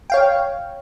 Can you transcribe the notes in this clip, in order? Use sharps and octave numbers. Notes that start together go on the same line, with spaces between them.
C#5 F5 G5